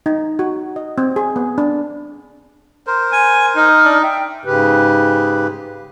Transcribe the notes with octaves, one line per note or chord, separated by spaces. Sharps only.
D#4
F#4
D#5
C4
G#4
B3
D4
A#4 C5
G#5
D#4 F6
D4 D5
E5 G5
G#2 C#3 G4 B4